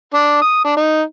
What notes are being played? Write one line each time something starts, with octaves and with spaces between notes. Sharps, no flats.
D4
D#6
D4
D#4